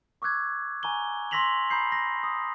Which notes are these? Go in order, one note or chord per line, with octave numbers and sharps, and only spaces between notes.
C#6 D6 E6 F#6 G#6
G#5 A#5 C#6 G7
C6 E6 A#6 B6 F7 F#7
A#5 B5 D#6 G6 C7
A#6
D#6